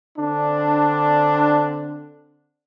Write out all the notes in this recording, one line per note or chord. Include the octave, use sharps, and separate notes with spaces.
D3 C4 D4